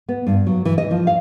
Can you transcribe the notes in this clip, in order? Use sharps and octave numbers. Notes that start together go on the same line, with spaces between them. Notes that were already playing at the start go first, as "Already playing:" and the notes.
B3
G2
F#3
E3
D#5
F3
F5